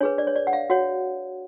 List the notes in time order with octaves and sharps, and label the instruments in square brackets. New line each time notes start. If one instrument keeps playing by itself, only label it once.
[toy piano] D4 G#4 B4 C#5
D5
C#5
D5
F#5
F5
F#4 C#5 F#5